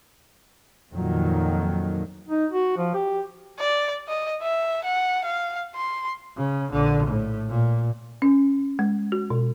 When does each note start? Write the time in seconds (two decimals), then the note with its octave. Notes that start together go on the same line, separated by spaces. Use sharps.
0.93 F2 A#2 D#3 F#3
2.29 D#4
2.51 F#4
2.77 F3
2.94 G4
3.59 D5
4.08 D#5
4.42 E5
4.84 F#5
5.25 F5
5.75 C6
6.37 C#3
6.70 A#1 D3
7.07 A2
7.49 A#2
8.22 C#4
8.79 G#3
9.12 F#4
9.30 B2